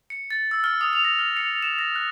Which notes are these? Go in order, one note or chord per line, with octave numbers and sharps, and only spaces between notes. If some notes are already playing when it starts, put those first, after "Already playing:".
C#7
A6
E6
F6
D#6
F7
A#6
F6
C#7
E7
A#6
F#6